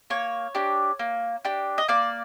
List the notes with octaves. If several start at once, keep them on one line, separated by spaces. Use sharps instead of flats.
A#3 C#5
D4 G4
A#3
D4 G4
D#5
A#3 D5